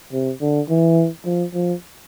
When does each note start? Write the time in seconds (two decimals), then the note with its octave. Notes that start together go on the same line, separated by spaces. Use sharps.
0.12 C3
0.41 D3
0.69 E3
1.25 F3
1.54 F3